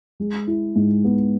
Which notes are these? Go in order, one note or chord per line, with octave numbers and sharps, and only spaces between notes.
G#3
E4
G#2
B3